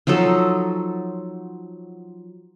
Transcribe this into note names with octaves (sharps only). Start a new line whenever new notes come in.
F3 F#3 D#4 A4